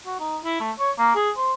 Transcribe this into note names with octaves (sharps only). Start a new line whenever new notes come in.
F#4
D#4
E4
A3
C#5
A#3
G#4
C5